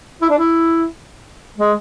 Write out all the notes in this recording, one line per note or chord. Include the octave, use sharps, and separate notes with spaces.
E4
D4
E4
G#3